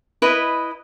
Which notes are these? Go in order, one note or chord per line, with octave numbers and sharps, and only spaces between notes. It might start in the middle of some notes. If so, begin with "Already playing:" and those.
E4 B4 D#5